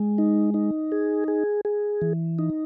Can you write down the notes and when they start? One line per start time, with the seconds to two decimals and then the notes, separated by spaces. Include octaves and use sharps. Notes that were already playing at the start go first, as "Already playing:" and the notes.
Already playing: G#3
0.18 D#4
0.54 D#4
0.92 G#4
1.28 G#4
1.65 G#4
2.02 E3
2.39 D#4